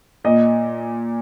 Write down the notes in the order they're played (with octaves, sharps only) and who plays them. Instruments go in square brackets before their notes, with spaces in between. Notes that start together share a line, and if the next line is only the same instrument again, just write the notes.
[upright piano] A#2 [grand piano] D#5